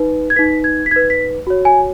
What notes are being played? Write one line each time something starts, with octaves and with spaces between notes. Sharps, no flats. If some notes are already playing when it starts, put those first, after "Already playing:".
Already playing: D#4 B4
G#6
D#4 B4 B6
G#6
B6
D#4 B4 G#6
B6
F#4 C#5
G#5